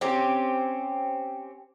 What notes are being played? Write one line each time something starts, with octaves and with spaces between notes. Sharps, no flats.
C4 C#4 G4